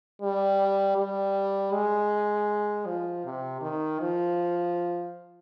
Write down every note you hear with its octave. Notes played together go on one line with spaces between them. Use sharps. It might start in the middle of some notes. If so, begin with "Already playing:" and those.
G3
G3
G#3
F3
C3
D#3
F3